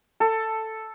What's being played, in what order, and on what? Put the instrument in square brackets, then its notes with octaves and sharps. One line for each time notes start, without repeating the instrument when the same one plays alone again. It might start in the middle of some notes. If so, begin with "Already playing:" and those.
[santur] A4